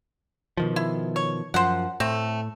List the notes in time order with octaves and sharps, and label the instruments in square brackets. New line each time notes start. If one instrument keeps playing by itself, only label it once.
[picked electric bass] B2 D#3 F3
[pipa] E4
C#5
[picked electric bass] F#2 F3 [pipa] C5 F#5
[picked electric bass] A2 [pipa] A3 C4